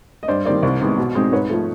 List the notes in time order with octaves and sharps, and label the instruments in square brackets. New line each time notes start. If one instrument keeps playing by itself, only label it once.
[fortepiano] D#5
G2 C5 D5
D#3 G3 A#3 C5 D5
C2
C3 D#3 G#3 B3
B2
G#3 C4 D#4
G#2 B4 C#5
F3 A3